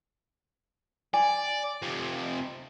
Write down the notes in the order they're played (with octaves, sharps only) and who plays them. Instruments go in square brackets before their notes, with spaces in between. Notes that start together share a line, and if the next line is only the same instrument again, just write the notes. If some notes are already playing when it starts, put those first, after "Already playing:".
[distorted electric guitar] D5 [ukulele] G#5
[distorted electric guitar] F2 C3